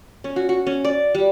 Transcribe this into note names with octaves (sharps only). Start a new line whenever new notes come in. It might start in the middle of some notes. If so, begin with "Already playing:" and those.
C#4
F#4
F#4
C#4
D5
G3